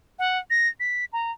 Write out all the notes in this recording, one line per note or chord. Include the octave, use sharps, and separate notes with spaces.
F#5
A#6
B6
A#5